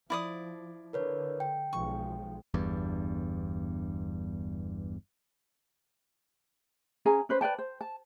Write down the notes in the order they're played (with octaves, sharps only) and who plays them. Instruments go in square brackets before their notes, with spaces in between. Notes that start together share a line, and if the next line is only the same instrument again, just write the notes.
[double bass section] F3 [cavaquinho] E4 D5 D#6
[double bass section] D3 [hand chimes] A#4 B4 C#5
[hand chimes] G5
[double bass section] B1 F3 G#3 [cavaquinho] C#6
[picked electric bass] G1 E2 G2
[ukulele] C#4 G#4 G#5 A#5
C#4 B4 C5
B4 D5 G5 A5
C5
A5